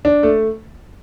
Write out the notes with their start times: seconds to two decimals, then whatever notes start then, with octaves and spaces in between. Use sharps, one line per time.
0.05 D4
0.23 A3